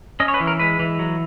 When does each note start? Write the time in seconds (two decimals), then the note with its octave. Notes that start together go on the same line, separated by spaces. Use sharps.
0.20 C#4 D#5
0.28 C#5
0.34 B4
0.40 E3
0.47 A#4
0.59 G#3 B4
0.79 E3
0.99 F#3